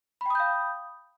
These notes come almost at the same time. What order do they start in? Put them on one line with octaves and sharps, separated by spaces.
B5 G5 D#6 G6 F5